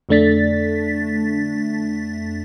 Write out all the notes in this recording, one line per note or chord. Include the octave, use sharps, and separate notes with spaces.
F2 D3 A3 D4 A6 B6